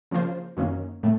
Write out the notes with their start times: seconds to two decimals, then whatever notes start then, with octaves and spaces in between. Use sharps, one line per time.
0.11 C#3 F3 A#3 F4 C5
0.57 F#2 D#3 A#3 C#4
1.03 A2 A3